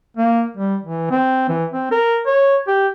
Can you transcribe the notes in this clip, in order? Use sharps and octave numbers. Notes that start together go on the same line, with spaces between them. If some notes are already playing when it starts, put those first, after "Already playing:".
A#3
G3
E3
C4
E3
C4
A#4
C#5
G4